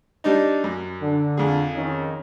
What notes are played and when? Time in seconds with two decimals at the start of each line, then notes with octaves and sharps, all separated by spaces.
0.24 G3 D4 D#4
0.64 F#2
1.01 D3
1.37 F2 G#4
1.76 D#3 C#4 D#4